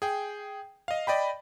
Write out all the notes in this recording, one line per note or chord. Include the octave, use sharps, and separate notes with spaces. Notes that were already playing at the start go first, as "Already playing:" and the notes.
G#4 G5
D#5 F5
D5 D#5 G5 B5